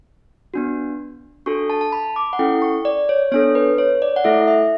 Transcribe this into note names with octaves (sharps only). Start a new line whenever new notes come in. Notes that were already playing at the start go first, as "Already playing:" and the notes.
B3 D4 F#4
D4 F#4 A4 C#6
A5
A5
B5
D6
F#5
C#4 E4 A4 G5
C#6
D5
C#5
B3 D4 A4 C#5
B4
C#5
D5
F#5
A3 E4 A4 E5
E5